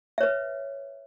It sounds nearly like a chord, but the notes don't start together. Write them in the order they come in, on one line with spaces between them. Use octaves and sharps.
E5 C#5 B4